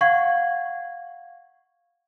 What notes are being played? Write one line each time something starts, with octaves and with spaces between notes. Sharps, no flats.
F5 F#5 C#6 G#6